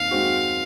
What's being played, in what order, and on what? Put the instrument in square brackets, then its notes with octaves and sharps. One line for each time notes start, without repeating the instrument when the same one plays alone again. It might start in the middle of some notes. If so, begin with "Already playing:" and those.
Already playing: [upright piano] D#2 C4 [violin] F5
[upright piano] D#3 G#3 C4 F#4